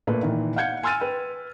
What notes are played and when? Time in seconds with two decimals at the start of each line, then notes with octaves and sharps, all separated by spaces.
0.07 A#2 A3 B4
0.23 A#2 D#3 E3
0.56 F5 F#5 G6 G#6 C#7
0.83 G#5 C6 E6 F6 A6 D#7
1.01 B4 G5